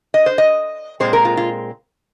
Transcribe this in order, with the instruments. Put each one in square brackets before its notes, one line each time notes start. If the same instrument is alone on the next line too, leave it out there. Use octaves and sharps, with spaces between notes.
[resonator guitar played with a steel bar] D#5
C5
D#5
A#2 G#3 C4 C5
A#4
F4
F4